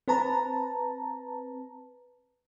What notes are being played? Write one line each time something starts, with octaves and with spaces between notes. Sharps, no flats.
C4 B4 A5 A#5